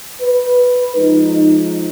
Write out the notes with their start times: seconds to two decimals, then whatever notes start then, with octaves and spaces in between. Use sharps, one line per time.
0.22 B4
0.97 F3 G#3 D#4